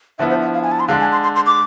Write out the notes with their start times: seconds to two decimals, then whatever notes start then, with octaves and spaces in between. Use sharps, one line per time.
0.19 D3 F3 B3 E4 E5
0.30 C5
0.42 E5
0.54 F5
0.63 G#5
0.72 A5
0.80 C6
0.88 D3 G#3 D4 F5
1.01 G#5
1.12 C6
1.23 C6
1.36 C6
1.46 D6